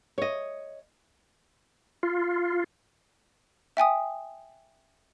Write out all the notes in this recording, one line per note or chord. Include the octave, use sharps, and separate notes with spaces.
C#5 D#5
F4
E5 G5 G#5 D#6